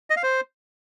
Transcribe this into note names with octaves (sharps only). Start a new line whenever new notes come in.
D#5
F5
C5